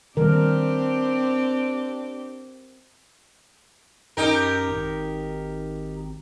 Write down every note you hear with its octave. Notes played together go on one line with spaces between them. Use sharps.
D#3 G3 A#3 C4 D4 G4 A#4
F#2 D#4 G4 A#4
G#1